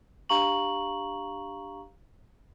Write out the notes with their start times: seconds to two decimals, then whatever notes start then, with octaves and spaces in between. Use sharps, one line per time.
0.29 D4 G4 F5 A#5 C#6 F#7